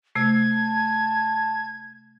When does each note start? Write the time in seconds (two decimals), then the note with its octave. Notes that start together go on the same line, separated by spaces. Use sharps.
0.16 C3 A3 G#6
0.52 A5